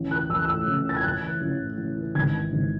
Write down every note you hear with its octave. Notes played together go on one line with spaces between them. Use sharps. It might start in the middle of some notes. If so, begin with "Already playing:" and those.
Already playing: A1
E3 F#6
A1 E6
F#6
A2 E6
A1
E3 A6
G#6
A1 F#6
E3
A1
A2
A1
E3
G#1 G#6
E3
G#1